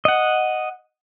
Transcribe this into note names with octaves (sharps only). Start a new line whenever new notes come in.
D#5 F#5